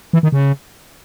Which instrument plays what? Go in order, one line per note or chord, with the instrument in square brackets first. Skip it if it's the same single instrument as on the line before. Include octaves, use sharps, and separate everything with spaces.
[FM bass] E3
D#3
C#3